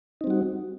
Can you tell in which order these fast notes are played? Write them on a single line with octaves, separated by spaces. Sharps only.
D#4 C4 G3 F#4